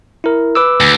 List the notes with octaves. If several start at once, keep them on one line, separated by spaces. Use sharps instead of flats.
E4 A#4
B4 D6 E6
D2